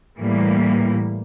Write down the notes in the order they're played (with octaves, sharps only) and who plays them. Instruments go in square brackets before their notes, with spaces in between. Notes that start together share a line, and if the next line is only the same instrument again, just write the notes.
[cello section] A2 E3 G3 A#3